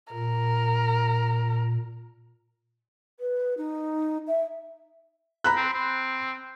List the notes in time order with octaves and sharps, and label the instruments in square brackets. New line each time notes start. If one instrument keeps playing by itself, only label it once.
[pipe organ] A#2 [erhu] A#4
[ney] B4
D#4
E5
[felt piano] A#5 B5 F#6
[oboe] C4
C4